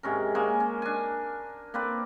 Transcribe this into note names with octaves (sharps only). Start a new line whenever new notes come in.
G#2 C3 C#4 A#4
G#3 A#3 C#4 G#5
C#4
D4 G#5
A#3 C4 B4 D5